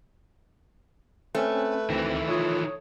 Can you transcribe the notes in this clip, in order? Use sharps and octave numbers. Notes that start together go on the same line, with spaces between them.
A3 C4 C#4 B4
D2 D#3 E3 C4 E4 A#6
F4 C#5 D#6